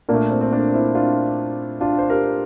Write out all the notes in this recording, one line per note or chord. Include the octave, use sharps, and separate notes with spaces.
A#2 A#3 D4
A3
C4
C4
A#3 D4
C4 E4
D4 F4
D4 F4
C5
G4 A#4